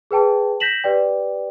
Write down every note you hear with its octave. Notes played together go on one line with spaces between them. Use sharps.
G#4 B4 G5 A5
G6 A#6 B6 E7 F#7
G4 B4 D5 G5